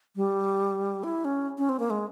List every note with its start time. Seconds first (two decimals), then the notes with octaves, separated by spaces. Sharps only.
0.16 G3
1.04 E4
1.25 C#4
1.58 C#4
1.69 C4
1.80 A#3
1.90 G#3